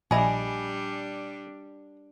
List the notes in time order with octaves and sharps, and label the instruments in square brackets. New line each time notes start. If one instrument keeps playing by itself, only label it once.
[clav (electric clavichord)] A#1 E5 [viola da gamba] G3 D4 [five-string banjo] G#4 D#5 [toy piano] G#5 B5